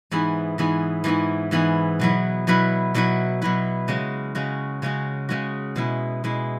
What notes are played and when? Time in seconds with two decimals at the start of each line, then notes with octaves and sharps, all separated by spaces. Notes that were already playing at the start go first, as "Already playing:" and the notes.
0.11 G#2 E3 B3 E4 G#4
0.58 G#2 E3 B3 E4 G#4
1.04 G#2 E3 B3 E4 G#4
1.51 G#2 E3 B3 E4 G#4
2.00 B2 F#3 E4 B4
2.47 B2 F#3 E4 B4
2.94 B2 F#3 E4 B4
3.42 B2 F#3 E4 B4
3.88 C#3 G#3 C#4 F#4
4.35 C#3 G#3 C#4 F#4
4.82 C#3 G#3 C#4 F#4
5.29 C#3 G#3 C#4 F#4
5.76 B2 G#3 E4
6.24 B2 G#3 E4